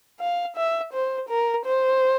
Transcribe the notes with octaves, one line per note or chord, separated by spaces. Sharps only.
F5
E5
C5
A#4
C5